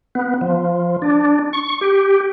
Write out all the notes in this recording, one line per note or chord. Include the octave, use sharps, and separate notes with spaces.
B3
F3
D4
C#6
G4